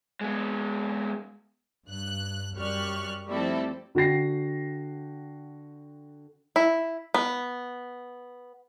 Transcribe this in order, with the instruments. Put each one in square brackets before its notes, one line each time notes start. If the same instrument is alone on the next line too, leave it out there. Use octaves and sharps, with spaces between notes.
[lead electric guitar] G#3 B3
[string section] G2 F#6
F#2 G3 G4 C#6 F6 F#6
F3 G3 A3 C4 E4 A4
[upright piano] D3 F#4 G5 A#6 C7
[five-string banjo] E4
B3